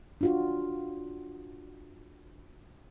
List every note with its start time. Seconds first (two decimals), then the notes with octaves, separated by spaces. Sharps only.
0.21 D4 F4 F#4